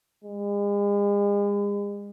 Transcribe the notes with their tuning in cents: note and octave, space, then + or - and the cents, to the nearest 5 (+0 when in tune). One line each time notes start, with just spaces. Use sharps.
G#3 -40